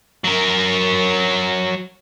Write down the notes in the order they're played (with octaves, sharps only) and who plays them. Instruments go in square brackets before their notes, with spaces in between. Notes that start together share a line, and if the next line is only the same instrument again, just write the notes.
[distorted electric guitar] F#3 A#4